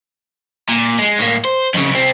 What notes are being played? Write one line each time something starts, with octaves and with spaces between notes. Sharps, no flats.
A#2
G#3
A2 A#3
C5
F2 C#3
C2 C4